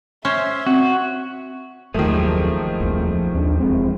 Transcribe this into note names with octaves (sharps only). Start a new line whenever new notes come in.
C#4 C5 E5
C4 F#4
F#1 D#2 D#3 F3 A3 A#3 G#4
D#1 A#1 F2
D#2 B3 D4
E1 G#3 C4